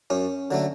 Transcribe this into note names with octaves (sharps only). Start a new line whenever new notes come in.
F#2 C#4
D3 F#3 A3